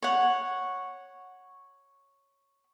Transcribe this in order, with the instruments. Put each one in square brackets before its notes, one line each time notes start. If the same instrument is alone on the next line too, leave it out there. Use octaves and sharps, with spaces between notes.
[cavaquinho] C#5 F#5